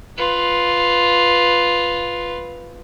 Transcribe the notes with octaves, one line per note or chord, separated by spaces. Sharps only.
F4 B4